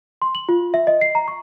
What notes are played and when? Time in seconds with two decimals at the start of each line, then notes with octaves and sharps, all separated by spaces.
0.22 C6
0.35 F#7
0.49 F4
0.74 E5
0.87 D#5
1.01 C7
1.15 A#5
1.28 C#6